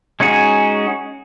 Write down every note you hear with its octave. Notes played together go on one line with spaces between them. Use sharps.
G#3 C#4 D#4 F#4 G#4